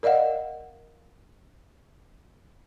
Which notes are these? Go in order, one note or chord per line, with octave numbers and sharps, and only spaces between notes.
A#4 D5 D#5 F5 F#5